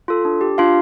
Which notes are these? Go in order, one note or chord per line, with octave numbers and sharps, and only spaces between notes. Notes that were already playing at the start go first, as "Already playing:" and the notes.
F4 A4
D4
G4
D4 F4 F5